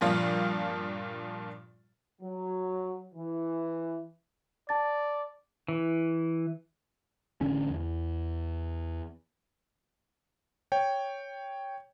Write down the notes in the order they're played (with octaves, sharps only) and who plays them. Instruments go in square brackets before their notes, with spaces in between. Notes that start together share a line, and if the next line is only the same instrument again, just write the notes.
[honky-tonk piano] G2 A#2 F3 F4
[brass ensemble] F#3
E3
[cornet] D5 [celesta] A5 A6
[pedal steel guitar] E3
[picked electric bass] A1 D3 C#4
E2
[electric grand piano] C#5 G5